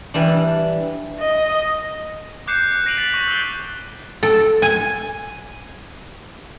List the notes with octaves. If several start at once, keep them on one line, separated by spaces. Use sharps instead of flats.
E3 G3 D4
D#5
D6 F#6 G6 C7 C#7 E7
A#6 C7 D7 D#7 F7 F#7
A6 B6 D7 F7 F#7
C#6
D6 E6 A6 E7 F7 G7
A4
G#5